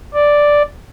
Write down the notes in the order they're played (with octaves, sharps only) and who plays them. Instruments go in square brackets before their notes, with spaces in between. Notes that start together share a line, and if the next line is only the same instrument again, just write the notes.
[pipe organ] D5